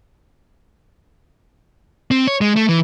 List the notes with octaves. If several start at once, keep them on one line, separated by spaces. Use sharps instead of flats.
C4
C#5
G#3
A3
E3